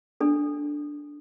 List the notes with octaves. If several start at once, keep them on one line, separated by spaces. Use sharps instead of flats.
D4 A4